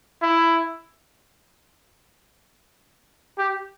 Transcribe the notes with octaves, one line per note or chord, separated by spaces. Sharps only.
E4
G4